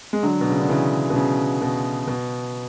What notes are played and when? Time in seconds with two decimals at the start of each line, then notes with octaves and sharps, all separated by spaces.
0.13 G#3
0.23 D3 F#3
0.41 B2
0.50 C#3
0.60 D3
0.69 C#3 E3
1.10 B2
1.16 C#3
1.62 B2
2.07 B2